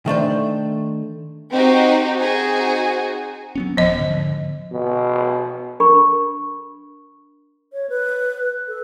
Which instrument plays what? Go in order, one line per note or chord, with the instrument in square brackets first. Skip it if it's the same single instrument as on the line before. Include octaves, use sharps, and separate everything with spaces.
[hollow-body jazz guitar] D#3 A3 D4 C5
[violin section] C4 D#4 F#4 G4 C5
C4 D#4 F#4 G#4 G#5
[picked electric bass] F#3 B3 C#4
[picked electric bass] D#1 B3 [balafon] F3 D#5
[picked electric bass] G#2 D3
[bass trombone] B2
[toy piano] D4 A#4 B5 C#6
[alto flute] C#5
B4
A4